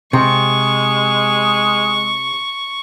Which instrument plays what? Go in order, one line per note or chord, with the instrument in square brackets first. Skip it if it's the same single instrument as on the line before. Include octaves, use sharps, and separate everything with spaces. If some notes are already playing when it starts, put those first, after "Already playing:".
[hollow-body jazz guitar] C3 [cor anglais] G#3 [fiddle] C#6